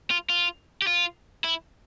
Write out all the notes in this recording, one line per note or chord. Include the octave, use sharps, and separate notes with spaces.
F4
F4
G4
F4
E4